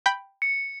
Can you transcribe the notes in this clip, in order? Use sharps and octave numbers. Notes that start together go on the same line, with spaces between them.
G5 B5 G6
C#7